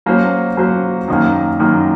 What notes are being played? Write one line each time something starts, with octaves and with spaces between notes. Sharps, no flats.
F#3 A#3 C#4 F#4 C5
F#3 A#3 C#4 F#4 C5
F#2 D#3 A#3
F#2 D#3 A#3